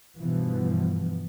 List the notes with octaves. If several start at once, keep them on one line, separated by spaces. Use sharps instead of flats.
G2 B2 E3 F3